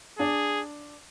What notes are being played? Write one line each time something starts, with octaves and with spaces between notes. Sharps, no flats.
D4 G#4